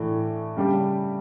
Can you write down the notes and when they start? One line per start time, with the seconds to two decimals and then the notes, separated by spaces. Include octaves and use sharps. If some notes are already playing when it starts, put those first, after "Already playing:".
Already playing: A2 E3 A3 D4
0.57 C#3 G3 D4 G4